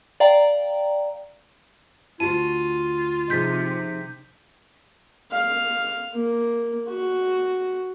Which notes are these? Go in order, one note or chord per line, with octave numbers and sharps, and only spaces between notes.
D5 F5 G5 A#5
D2 F4 F#4 A5 D#7
C3 F3 D#4 G#4 G6 B6
F5
A#3
F#4